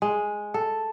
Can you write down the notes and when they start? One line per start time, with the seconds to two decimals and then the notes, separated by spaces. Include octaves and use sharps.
0.02 G#3
0.54 A4